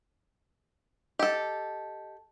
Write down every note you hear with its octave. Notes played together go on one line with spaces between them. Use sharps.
G4 A4 D#5